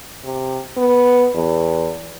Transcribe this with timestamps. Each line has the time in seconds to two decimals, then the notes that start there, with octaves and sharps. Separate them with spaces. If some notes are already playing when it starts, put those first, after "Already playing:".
0.25 C3
0.77 B3
1.34 E2